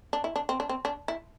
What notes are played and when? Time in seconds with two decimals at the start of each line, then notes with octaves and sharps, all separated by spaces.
0.13 D4
0.24 E4
0.36 D4
0.49 C4
0.60 D4
0.69 C4
0.85 D4
1.08 E4